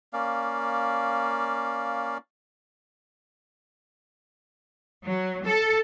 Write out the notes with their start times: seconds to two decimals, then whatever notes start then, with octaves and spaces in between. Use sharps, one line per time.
0.13 A#3 C#4 D5 F5
5.04 F#3
5.44 A4